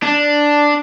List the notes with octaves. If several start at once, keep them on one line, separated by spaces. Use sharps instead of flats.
D4